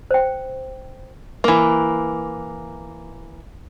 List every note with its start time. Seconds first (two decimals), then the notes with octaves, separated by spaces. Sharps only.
0.11 C5 G5
1.44 E3 A#3